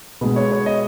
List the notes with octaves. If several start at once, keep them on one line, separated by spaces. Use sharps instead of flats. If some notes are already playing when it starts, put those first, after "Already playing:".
B2 G#3 B3 B4
C#5
C#5
D#5